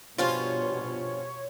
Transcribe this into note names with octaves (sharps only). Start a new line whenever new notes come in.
G2 B2 F3 C#4 F4 C#5